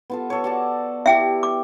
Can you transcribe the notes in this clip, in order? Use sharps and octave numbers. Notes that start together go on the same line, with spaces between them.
B3 F4 A4
A4 C#5
F#4 D5 A5
E4 G4 E5 G5
D6